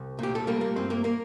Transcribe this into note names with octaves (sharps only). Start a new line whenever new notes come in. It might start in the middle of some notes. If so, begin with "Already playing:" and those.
Already playing: C2
A#2 G4
A4
G3 A#3 A#4
A#3 A#4
G2 C4 C5
A#3 A#4
A#3 A#4